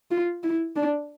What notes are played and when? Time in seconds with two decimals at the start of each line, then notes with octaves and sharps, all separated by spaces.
0.11 F4
0.43 E4
0.76 D4